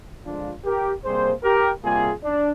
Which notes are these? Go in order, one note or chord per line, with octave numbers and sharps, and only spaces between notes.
D3 F3 G#3 D4 F4
G4 A#4
C3 G3 A#3 G#4 C5
G4 A#4
C3 G3 A#3 F4 G#4
D4